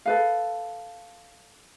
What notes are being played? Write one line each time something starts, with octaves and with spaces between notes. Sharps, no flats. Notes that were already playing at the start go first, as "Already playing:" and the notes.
A4 B4 F5